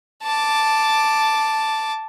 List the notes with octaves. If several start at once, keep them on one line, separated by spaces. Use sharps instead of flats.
A5 D6